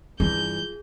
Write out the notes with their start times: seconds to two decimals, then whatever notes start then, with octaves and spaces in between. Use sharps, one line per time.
0.20 G2 E3 F4 G#4 G6